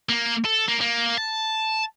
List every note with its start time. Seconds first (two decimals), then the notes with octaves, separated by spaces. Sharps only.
0.09 A#3
0.45 A4
0.68 A#3
0.81 A#3
1.18 A5